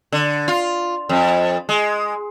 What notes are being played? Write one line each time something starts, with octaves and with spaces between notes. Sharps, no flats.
D3
F4
F2
G#3